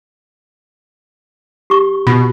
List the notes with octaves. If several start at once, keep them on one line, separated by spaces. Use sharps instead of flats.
G4 C#6
B2 F4